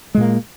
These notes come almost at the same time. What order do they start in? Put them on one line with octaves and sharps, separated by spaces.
G#3 A#2 A#3